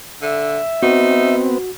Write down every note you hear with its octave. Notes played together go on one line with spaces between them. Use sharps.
D3 E5
B3 C4 D#4 F#4